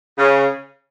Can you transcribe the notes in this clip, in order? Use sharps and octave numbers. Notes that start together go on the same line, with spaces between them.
C#3